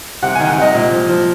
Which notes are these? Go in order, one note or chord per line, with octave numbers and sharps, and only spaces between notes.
C3 F#5
D#3 G#5
F#5
C3
D#5
A#2
F3
F3